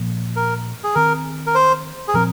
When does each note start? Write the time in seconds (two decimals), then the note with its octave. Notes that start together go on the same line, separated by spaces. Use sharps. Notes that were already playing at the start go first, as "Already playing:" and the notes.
Already playing: A#2 F3 A#3
0.36 A#4
0.84 G#4
0.95 D#3 C4 A#4
1.47 A#4
1.55 C5
2.08 G#4
2.14 A#2 F3 C4 A#4